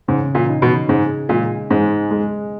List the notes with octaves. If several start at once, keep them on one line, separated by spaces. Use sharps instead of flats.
G#2 C#3
A#2
D#4
B2
G#2 G#4
A#2 G#3
G#2 G#3
G#3